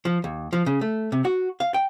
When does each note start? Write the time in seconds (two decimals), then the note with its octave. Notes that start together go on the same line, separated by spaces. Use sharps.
0.05 F3
0.24 D#2
0.53 F3
0.66 C#3
0.81 A3
1.12 C3
1.25 F#4
1.60 F5
1.74 G5